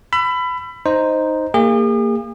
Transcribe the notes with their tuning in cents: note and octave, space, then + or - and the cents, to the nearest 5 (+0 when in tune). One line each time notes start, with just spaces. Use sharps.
B5 +20 E6 +40
D#4 +0 C5 +0
A#3 -25 G#4 -45